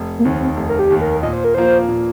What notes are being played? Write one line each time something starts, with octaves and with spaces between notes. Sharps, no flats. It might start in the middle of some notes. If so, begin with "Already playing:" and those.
Already playing: F1
A#3
D#2 D#3 C4
F1
A#4
G4
D#2 D#3
A#4
A#2 D#5
C5
A#4
F3 A#3 F4 C5
A#2